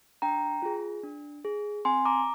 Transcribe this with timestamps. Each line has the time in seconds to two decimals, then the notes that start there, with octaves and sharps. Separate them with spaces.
0.22 D4 G5 A#5
0.62 F4 G#4
1.03 D4
1.45 G#4
1.85 C4 G#5 C6
2.05 A#5 D6